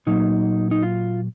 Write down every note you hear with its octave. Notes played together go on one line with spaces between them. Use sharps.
A#2 F#3 A#3 D#4
D#4
F4